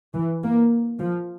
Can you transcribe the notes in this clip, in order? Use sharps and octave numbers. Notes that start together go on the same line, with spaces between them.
E3
A#3
F3